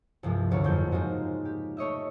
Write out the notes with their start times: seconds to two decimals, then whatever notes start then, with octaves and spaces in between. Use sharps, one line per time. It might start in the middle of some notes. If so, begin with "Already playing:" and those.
0.23 C2 G2 F3 G#3
0.51 G1 D2 A#3 C#5
0.64 F#1 F2 G#2 A#3 G6
0.91 G#3 D#4 F4 F#4 A#4
1.45 G4
1.77 A3 C#5 D#5 E5